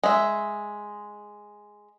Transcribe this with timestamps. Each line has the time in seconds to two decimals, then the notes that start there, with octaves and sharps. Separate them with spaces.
0.04 G#3 E5